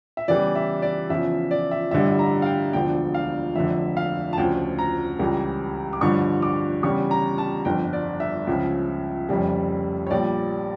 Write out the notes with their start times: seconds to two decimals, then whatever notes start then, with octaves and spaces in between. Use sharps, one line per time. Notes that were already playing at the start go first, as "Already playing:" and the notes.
0.17 E5
0.28 E2 C#3 E3 G3 D5
0.56 E5
0.82 D5
1.09 E2 C#3 F3 E5
1.51 D5
1.71 E5
1.91 A1 G2 D3 G3 E5
2.19 A#5
2.42 F5
2.46 G5
2.73 E1 D2 D3 F3 G5
3.14 F5
3.55 F1 F2 D3 E5
3.97 F5
4.33 A5
4.38 D2 C#3 F3 G5
4.79 A#5
5.19 C#2 C#3 E3 G3
5.93 D6
6.01 A1 G2 D3 F3 C#6
6.42 D6
6.83 E2 C#3 G3 C#6
7.11 A#5
7.38 A5
7.65 G1 F2 D3 G5
7.93 D5
8.20 E5
8.47 C#2 C#3 F3
9.29 F1 F2 C#3 G3
10.07 C#5
10.10 A#1 A#2 G3 D5